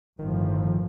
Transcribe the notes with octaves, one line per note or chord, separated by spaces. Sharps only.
G1 A2 D#3 F3